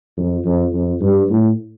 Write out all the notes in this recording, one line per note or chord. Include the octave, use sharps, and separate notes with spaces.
F2
F2
F2
G2
A2